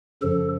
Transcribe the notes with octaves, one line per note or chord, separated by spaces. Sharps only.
F#2 C#3 F3 A4